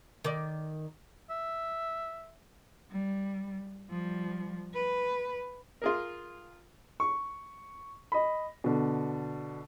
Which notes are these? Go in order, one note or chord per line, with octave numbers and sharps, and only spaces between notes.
D#3 D5
E5
G3
F3 G3
B4
F4 G#4 A#4
C#6
D#5 B5
B2 D3